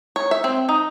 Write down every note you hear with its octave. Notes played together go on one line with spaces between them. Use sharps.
C#5
E5
C4
D#4